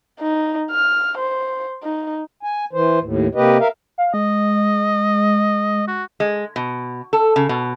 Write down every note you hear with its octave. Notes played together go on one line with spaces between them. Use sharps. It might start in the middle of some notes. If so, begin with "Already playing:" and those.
D#4
F6
C5
D#4
G#5
E3 C5
D#2 A2
C3 A#3 G4 B4 D#5
A#4 E5 F5
F5
G#3 D#5
F#4
G#3
B2
A4
C#3
B2